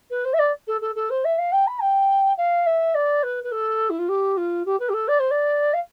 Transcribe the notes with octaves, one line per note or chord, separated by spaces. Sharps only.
B4
C5
E5
D5
A4
A4
A4
C5
E5
F5
G5
B5
G5
F5
E5
D5
B4
B4
A4
E4
F4
G4
F4
G4
B4
G4
A4
D5
C5
D5
F5